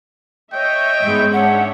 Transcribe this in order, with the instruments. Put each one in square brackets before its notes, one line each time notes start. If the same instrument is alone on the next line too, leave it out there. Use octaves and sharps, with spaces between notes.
[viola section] C#5 D#5 E5 [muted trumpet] G5
[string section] G#2 G#3 B3
[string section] C#4 [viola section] D4 C#5 E5 [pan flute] F#5